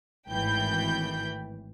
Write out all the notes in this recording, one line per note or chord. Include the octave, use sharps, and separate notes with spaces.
G#1 A2 E3 G5 B5 G6